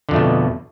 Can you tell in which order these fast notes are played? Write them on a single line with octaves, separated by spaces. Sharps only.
D3 F2 A3 B2